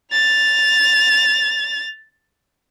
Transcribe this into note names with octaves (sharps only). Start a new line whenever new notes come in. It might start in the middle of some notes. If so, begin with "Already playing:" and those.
A6 F7